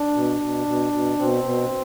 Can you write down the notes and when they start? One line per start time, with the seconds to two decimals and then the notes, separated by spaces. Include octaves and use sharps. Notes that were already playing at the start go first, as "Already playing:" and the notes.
Already playing: D4
0.15 B2
0.40 B2
0.66 B2
0.92 B2
1.18 B2 C4
1.44 B2